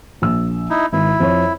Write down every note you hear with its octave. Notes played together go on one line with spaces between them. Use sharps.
A#1 E6
D#4 E4
G#1 E4
F2 C#5